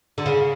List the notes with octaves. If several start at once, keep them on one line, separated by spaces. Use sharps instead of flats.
D3
C#3